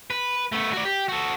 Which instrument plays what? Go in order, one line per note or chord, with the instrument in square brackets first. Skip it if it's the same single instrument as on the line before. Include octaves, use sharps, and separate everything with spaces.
[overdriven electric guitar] B4
A3 B3
F#4 D5
G4
F#4 A4